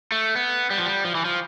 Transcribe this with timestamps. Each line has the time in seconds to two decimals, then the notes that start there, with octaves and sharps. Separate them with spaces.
0.12 A3
0.35 B3
0.70 G3
0.78 F3
0.85 G3
1.05 F3
1.15 E3
1.25 F3